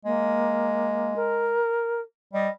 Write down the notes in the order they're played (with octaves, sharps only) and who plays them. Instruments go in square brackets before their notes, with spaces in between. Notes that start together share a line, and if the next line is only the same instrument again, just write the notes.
[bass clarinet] G#3 [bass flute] A#3
[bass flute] A#4
[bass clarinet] G3 [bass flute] D#5